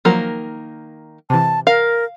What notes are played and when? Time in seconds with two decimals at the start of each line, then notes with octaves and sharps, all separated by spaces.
0.05 D#3 F3 F#3 A#3 A#4
1.30 C3 E3 A5
1.67 A#4 F5